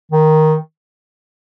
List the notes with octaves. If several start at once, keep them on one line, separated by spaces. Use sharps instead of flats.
D#3